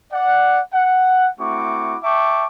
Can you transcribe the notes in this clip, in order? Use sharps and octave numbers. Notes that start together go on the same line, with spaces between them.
D5 F#5
F#5
A3 C4 E4 F#4 C#6 D6
E5 G5 A5 C#6 D6